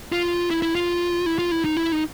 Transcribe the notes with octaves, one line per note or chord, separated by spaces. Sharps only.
F4
E4
E4
F4
E4
F4
E4
D#4
E4
D#4